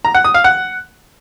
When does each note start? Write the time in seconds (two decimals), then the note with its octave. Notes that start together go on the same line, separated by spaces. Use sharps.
0.05 A#5
0.15 F#5
0.24 D#6
0.34 F5
0.44 F#5